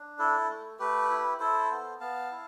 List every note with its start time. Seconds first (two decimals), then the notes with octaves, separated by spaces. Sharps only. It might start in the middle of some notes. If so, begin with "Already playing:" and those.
Already playing: D4
0.19 E4 A4
0.50 A3
0.79 A3 G4 B4
1.10 E4
1.40 E4 A4 C5
1.71 B3
2.00 B3 F5 A5
2.31 E4